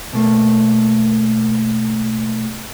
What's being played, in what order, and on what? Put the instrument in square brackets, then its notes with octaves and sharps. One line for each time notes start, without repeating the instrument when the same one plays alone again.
[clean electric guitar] B2 A3 A#3